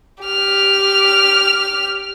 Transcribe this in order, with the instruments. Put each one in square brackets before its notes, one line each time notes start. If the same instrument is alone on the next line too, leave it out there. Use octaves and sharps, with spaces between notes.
[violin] G4 F6